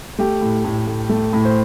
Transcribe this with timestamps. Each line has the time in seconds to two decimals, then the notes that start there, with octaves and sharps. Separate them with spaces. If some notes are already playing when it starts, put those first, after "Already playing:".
0.19 A3 G4
0.42 A2
0.65 A2
0.87 A2
1.09 A3
1.33 A2
1.45 C5